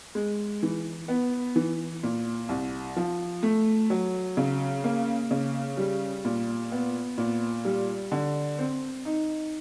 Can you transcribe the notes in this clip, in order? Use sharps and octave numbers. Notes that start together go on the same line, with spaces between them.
G#3
E3
B3
E3
A#2
C2
F3
A3
F#3
C#3
A#3
C#3
G3
A#2
B3
A#2
G3
D3
C4
D#4